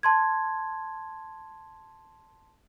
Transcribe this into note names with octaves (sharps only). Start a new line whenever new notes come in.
A5 C6 G#6